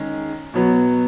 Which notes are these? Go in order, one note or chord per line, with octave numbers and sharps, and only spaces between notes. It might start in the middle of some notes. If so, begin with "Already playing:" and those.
Already playing: D#3 G#3 C#4
B2 F#3 B3